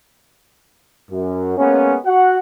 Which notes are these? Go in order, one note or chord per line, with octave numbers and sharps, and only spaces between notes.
F#2
G#3 A#3 B3 C#4
F#4 F#5